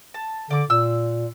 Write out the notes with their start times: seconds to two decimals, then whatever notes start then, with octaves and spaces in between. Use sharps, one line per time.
0.14 A5
0.50 D3 D5 D6
0.70 A#2 E6